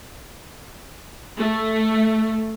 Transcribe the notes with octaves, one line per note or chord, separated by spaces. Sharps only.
A3